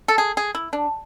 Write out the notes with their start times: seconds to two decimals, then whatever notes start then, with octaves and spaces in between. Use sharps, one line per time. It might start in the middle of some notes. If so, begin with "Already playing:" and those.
0.08 A4
0.18 G#4
0.37 G#4
0.55 E4
0.73 D4